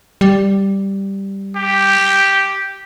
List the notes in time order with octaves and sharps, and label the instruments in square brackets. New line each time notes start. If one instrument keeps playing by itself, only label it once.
[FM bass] G3
[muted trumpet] G4